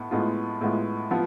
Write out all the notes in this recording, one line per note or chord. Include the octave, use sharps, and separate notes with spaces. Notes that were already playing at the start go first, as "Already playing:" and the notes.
Already playing: A2 B3
A2 G#3 B3 F4
A2 G#3 B3 F4
F3 B3 F4